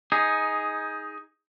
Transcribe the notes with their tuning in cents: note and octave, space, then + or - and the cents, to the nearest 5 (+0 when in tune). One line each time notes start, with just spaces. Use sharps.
D#4 +15 G#4 +0